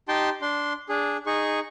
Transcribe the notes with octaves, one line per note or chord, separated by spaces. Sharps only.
D#4 G4 G5 A5 C6
D4 C6
D4 G#4
D#4 G#4 C#6